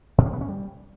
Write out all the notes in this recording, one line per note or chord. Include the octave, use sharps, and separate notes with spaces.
A#2
A#3
B3
C#4
G3